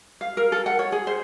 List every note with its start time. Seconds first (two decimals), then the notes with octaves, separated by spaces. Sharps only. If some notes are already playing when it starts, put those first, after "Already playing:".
0.21 F5
0.37 A#4
0.52 A4
0.66 F#5
0.79 C#5
0.92 G#4
1.07 C5